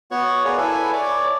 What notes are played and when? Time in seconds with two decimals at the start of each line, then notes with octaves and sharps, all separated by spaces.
0.11 B3 F#4 C#5 F#5 C#6
0.45 G#4 A#4 B4 C#5 D5 F5
0.58 E4 A4 B4 G#5
0.93 C#5 D5 D6